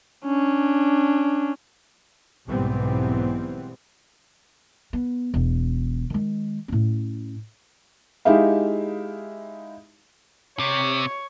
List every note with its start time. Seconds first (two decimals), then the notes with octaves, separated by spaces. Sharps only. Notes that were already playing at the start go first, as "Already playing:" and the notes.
0.25 C#4 D4
2.46 B1 G#2 E3 G3 B3 C4
4.93 B3
5.34 E1
6.10 D#3 G#3
6.68 A2 C#4
8.25 G#3 D#4 E4 G4 E5 F5
10.59 C3 C#5